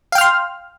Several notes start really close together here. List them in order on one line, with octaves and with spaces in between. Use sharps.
F5 G5 F6 C6